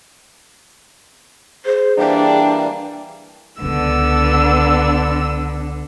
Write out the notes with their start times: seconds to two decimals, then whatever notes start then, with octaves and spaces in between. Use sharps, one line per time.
1.65 G#4 C5
1.98 E3 G3 A#3 D4 G5
3.62 C#2 D3 D#3 B3 D4 E6